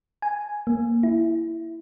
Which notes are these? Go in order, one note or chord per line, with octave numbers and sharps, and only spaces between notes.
G#5
A#3
E4